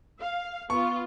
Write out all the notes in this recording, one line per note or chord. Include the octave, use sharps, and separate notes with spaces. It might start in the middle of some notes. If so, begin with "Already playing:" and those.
F5
B3 F4 C#6